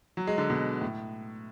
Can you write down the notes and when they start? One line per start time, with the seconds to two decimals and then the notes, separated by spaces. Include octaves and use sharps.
0.17 F#3
0.27 G#3
0.38 D3
0.50 B2
0.81 A2